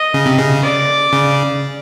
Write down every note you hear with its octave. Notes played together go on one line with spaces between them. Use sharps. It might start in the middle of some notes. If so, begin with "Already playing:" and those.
Already playing: D#5
C#3
C3
C#3
D5
C#3